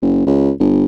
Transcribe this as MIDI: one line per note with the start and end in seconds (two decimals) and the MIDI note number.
0.02 0.23 30
0.27 0.52 37
0.60 0.86 31